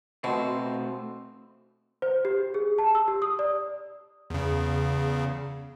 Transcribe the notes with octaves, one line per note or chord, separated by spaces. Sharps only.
B2 A3 C4 C5
C5
G4
G#4
A5
E6
G4
D#6
D5
E2 C#3